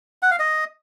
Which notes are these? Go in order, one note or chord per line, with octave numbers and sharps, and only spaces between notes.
F#5
F5
D#5